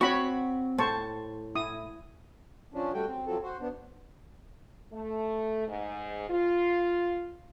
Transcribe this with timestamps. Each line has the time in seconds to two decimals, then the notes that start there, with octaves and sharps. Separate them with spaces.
0.01 C4 F#4 C#5 B5 C#6
0.78 A2 C5 A5 C#6
1.55 E4 D#6
2.74 F3 C#4 D4
2.94 G3 A3 F#4 G5
3.07 C4
3.27 F3 F#3 C4 A4
3.43 F#4 C5
3.61 B3 D4
4.92 A3
5.68 G#2
6.30 F4